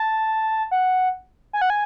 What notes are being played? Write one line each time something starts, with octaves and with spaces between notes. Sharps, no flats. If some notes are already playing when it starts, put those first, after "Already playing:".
Already playing: A5
F#5
G#5
F#5
G#5